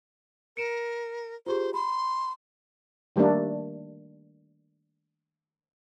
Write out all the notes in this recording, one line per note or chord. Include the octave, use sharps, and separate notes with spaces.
A#4 C#7 D7 E7
F4 G4 G#4 C5
B5 C6
D#3 G3 A3 A#3 D4